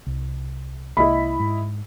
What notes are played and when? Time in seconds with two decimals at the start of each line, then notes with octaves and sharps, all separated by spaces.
0.07 C2
0.97 C2 G#3 A#3 E4 D#5 B5
1.40 G#2